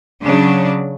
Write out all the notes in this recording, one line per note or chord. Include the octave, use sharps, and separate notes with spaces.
C#3 F#3 D4